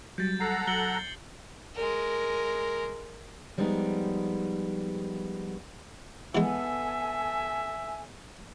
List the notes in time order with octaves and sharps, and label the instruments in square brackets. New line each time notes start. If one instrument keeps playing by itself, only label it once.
[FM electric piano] F#3 G3 [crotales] G6 A6
[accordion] A4 F#5 A#5 [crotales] C7
[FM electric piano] F#3 [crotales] C#7 F#7 G7
[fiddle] G#3 A#4
[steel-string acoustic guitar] F3 G3 G#3 B3 D4 D#4
[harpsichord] E3 G#3 [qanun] B3 [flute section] A4 G#5 [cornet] E5